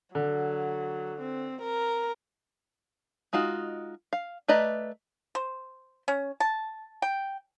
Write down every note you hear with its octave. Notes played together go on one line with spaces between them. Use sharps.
D3 F#3
C4
A#4
G#3 D#4 F4 F#4
F5
A3 B4 D5 D#5 A#5
C5
C#4
A5
G5